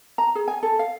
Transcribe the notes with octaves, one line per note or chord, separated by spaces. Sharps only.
A#5
G#4
G#5
A4
F5